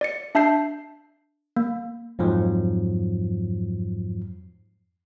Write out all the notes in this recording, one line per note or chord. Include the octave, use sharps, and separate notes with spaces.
D5 A6 C#7
D4 E5 A5 G6 C7
A#3
F2 G#2 F3 F#3